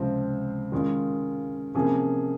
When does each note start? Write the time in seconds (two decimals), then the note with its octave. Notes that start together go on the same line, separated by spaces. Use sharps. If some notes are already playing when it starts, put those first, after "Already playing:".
Already playing: C#2 C3 F3 C4
0.72 D#3 G#3 C#4 F4
1.74 C3 F3 A#3 C#4 G#4